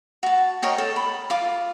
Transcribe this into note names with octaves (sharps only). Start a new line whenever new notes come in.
F#4 A5
A#4 C#5 D#5 G5
A4
B5
F4 D6